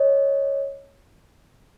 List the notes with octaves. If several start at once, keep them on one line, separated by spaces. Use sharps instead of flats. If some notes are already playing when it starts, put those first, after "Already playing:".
Already playing: C#5 D#5